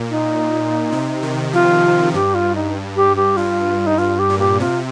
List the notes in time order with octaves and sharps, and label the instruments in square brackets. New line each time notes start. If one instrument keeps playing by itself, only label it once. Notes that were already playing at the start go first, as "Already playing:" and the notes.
Already playing: [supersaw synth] A#2
[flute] D#4
[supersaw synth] C3
D#3
[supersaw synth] F3 [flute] F4
[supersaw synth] G2 [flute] G4
[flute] F4
D#4
G4
G4
[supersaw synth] G2 [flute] F4
[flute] D#4
[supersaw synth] G2 [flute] F4
[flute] G4
[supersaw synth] A#2
[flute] G4
[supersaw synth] C3 [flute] F4